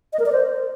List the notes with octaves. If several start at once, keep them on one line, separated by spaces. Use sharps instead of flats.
D#5
A#4
D5
C5